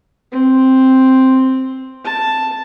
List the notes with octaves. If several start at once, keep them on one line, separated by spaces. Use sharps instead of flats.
C4
A5